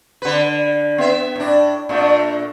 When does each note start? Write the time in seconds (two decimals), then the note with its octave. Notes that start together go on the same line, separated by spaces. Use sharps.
0.22 D3 B4
0.98 B3 E5
1.36 A2 D4
1.89 A#2 A3 D4